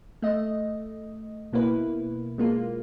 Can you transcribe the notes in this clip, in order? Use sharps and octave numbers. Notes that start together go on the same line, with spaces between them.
A3 D#5
B2 A#3 E4 B4
G#3 A#3 F4